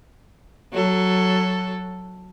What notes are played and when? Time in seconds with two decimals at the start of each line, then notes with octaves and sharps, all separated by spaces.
0.72 F#3 A4